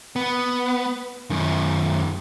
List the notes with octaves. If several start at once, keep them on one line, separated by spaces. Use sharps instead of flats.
B3
F#2 D#3